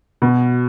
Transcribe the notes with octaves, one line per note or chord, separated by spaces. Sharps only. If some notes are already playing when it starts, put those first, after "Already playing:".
B2